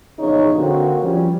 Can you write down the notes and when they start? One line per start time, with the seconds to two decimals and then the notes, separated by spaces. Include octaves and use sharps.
0.19 A#1 E2 C#3 D#4 C#5
0.56 D3 A#3 C4 F#4
1.03 F3 G3 C#4